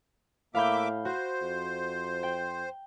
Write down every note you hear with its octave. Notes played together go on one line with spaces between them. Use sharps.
A2 A#3 E5 F5 B5 D6 G6
F#4 C5
F2
G5